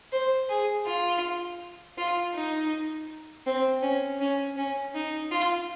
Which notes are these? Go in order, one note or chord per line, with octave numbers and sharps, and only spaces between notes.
C5
G#4
F4
F4
D#4
C4
C#4
C#4
C#4
D#4
F4